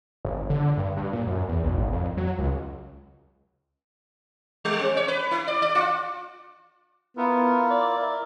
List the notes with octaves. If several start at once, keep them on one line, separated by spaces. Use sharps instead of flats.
G1
D3
G2
G2
A#2
F#2
E2
B1
G#1
F2
F#3
C#2
G3
C4
C#5
B4
E4
D5
D5
F4
B3 E4 F4 A#4
D5
A#4 E5